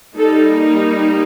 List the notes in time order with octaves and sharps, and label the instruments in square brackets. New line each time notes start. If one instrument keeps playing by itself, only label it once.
[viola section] G3 A#3 D#4 A4